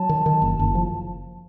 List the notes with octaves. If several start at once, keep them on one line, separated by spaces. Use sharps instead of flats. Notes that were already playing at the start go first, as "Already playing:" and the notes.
Already playing: F#3 A5
D#3
D#3
F#1
F#1
F3